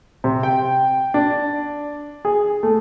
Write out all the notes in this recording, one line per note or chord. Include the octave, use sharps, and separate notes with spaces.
C3
G5
D4
G#4
A3